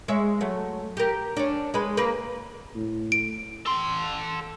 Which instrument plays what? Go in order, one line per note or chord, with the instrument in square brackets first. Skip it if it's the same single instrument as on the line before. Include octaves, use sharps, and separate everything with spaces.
[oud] G#3 C#5 E5
F#3 A3
G4 A#4
C#4 D4
G#3 B4
A#3 A#4 B4
[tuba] A2
[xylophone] D7
[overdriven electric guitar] A4 C6